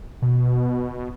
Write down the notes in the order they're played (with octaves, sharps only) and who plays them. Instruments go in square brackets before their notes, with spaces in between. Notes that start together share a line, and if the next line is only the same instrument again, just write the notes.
[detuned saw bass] B2